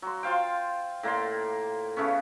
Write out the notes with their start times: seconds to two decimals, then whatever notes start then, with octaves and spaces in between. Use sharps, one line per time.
0.02 F#3 C6
0.23 F4 C5 F5 G5
1.03 A2 A#3 D5 C6
1.97 C#3 A3 B3 C#4